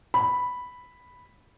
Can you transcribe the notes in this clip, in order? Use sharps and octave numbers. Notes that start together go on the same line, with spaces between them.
B5